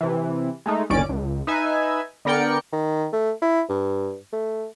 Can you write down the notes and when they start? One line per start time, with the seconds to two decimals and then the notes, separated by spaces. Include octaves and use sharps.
0.01 C3 E3
0.66 G#3 A3 D#4
0.90 G1 D#2 C#4 D5 D6 D7
1.09 C#2
1.47 D#4 B4 E5 G#5
2.25 D3 B3 A#4 D5 G5 C#7
2.73 D#3
3.12 A3
3.42 E4
3.69 G2
4.33 A3